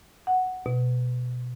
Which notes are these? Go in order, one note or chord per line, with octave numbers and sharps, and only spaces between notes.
F#5
B2